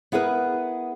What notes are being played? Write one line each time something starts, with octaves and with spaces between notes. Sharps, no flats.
B3 E4 G#4 A#4 B4